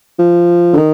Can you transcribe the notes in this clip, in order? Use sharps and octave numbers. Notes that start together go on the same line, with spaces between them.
F3
D3
D#3